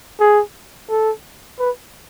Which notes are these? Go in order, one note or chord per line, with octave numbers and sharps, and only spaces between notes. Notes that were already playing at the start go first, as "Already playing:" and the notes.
G#4
A4
B4